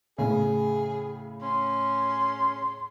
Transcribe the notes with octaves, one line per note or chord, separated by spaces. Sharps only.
A2 C#3 G#4
C#4 C6